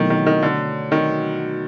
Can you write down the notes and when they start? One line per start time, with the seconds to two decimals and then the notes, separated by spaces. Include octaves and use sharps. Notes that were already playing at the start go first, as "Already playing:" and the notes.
Already playing: B2 D#3 E3 F#3 A3
0.10 D#3
0.26 D#3
0.42 D3
0.92 D#3